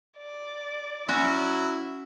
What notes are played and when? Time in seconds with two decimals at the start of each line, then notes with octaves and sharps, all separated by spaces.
0.18 D5
1.08 F#3 C#4 E4 F#4